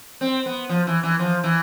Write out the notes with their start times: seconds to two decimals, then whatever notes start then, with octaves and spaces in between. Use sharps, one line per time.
0.21 C4
0.46 B3
0.69 F3
0.87 E3
1.03 E3
1.19 F3
1.44 E3